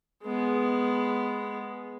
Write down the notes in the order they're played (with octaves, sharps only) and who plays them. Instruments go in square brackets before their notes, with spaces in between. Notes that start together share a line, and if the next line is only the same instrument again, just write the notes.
[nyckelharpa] G#3 B3